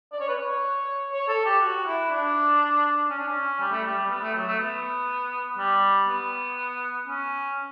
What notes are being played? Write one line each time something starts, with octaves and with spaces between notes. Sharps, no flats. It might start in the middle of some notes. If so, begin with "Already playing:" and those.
D5
C#5
B4
C#5
C#5
A4
G4
F#4
E4
D4
C#4
D4
C#4
G3
A3
G3
G3
B3
A3
F#3
A3
B3
G3
B3
C#4